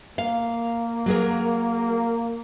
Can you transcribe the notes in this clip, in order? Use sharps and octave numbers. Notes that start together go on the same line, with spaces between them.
A#3 F5
F#3 G#4 A#4